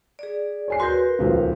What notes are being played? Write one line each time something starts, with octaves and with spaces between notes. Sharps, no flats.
G#4 D5
C#5 G#5 C7
F#4 A#4 B4 C6 G6
D#1 C#2 F3